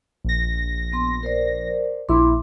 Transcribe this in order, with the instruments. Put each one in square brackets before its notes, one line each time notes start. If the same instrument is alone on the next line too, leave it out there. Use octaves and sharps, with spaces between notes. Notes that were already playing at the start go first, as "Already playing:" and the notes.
[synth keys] A#1 A#6
[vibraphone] B3 C6
A#4 C5 D5
[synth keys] A#1 E4 [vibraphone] C6 D6